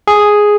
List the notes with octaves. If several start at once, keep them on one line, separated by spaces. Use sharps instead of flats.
G#4